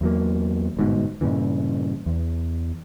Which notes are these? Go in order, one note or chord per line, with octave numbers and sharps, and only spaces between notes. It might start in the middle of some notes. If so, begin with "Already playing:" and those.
E2 F#3 A#3
G1 G#2 B2
G2 A#2 C#3 E3
E2